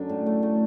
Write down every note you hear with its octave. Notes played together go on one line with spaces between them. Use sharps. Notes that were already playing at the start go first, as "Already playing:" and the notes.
Already playing: F#2 D3 F#3 D4
A2
A3
A3